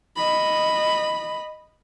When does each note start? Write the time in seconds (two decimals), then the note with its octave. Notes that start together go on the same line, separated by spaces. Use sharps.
0.16 D#5 B5